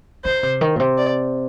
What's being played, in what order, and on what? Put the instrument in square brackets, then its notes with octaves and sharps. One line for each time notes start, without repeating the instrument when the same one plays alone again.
[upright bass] D3 [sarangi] C5
[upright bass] C3
D#3
A#2
C3
[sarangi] D5